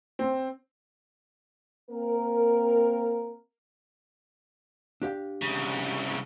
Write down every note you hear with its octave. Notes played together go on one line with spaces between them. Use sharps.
C4
A#3 C4 A#4
D4 G4 F5
C2 C#3